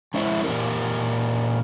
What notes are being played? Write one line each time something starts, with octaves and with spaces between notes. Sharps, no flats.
G#3 C#4 E4 C5 E5
A#2 E3 G4 A#4